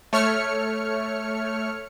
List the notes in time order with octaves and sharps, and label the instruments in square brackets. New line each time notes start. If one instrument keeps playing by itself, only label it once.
[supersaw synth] A3 C#5 F6 C#7